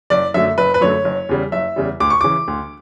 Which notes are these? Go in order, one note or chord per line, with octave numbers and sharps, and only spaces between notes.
F#1 D5
F#2 D3 F#3 A3 E5
F#1 B4
B4
F#2 D3 F#3 A3 C#5
F#1
E2 C#3 G3
F#1 E5
E2 C#3 G3
D2 D6
C#6
C#3 E3 D6
D2